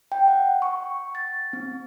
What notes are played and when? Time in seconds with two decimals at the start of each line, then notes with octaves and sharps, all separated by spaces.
0.12 G5
0.28 F#5
0.62 C#6
1.15 A6
1.53 C4